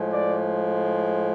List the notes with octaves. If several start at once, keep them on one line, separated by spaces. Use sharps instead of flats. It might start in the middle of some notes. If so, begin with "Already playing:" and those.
Already playing: A2 F3 G#3
D5